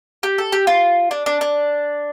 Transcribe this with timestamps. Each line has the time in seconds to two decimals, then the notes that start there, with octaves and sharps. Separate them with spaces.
0.23 G4
0.38 A4
0.52 G4
0.67 F4
1.11 D4
1.26 D4
1.41 D4